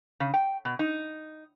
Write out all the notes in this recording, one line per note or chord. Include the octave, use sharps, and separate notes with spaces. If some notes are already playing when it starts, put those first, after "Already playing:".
C#3
G5
B2
D#4